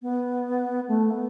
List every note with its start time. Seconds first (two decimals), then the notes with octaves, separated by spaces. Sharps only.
0.02 B3
0.88 A3
1.11 B3